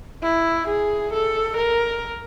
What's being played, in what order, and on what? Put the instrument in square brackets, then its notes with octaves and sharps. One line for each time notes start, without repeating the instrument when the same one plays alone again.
[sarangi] E4
G#4
A4
A#4